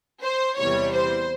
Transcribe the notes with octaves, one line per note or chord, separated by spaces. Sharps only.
C5
E2 C3 E3 G3 C#5
C5